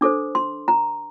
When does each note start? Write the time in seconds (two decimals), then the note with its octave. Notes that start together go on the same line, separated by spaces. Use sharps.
0.01 D4 A4 C5 D6
0.35 C6
0.68 A#5